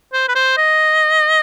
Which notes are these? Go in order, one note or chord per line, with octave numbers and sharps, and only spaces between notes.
C5
B4
C5
D#5